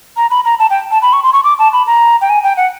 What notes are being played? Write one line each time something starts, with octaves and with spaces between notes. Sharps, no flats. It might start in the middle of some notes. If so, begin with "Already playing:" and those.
A#5
B5
A#5
A5
G5
A5
B5
C#6
C6
C#6
D6
A5
B5
A#5
G5
G#5
G5
F#5